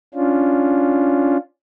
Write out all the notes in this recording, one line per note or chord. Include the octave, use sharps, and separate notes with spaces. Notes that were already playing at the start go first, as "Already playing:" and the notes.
C#4 D4 F4